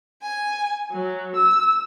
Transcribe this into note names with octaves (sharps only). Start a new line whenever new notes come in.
G#5
F#3
E6